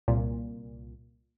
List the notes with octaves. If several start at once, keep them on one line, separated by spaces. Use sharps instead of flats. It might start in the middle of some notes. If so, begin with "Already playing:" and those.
C2 A#2